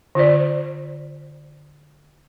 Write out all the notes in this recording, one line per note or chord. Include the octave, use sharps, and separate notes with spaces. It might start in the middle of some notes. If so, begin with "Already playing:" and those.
D3 F4 C5 D5